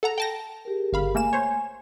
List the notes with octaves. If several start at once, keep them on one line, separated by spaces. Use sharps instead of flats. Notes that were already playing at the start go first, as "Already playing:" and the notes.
A4 F#5 A#5
G5 A5 A#6
G4 G#4 A#4
G1 F5 B5
A3 A#3 G#5 E7
C5 C#5